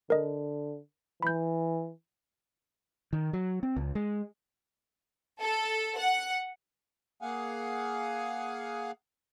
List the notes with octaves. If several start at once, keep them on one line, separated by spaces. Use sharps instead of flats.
D3 A#4 D#5
E3 B5 G6
D#3
F#3
C4
C#2
G#3
A4
F#5
A#3 G#4 F5 F#5 G#5